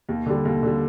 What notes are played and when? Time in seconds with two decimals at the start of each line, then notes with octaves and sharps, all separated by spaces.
0.09 D#2
0.26 D3 G3
0.45 D#2
0.63 D3 G3